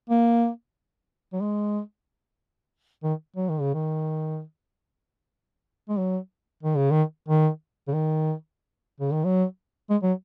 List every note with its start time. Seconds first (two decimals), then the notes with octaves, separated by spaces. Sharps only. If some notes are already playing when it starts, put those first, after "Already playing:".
0.10 A#3
1.33 F#3
1.41 G#3
3.04 D#3
3.36 F#3
3.49 D#3
3.61 C#3
3.74 D#3
5.89 G#3
5.98 F#3
6.63 D#3
6.77 C#3
6.91 D#3
7.29 D#3
7.88 C#3
7.94 D#3
9.00 C#3
9.12 D#3
9.25 F#3
9.90 G#3
10.03 F#3